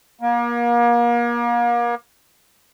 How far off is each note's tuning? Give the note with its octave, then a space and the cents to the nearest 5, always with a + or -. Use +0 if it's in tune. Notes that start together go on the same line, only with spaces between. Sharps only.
A#3 +35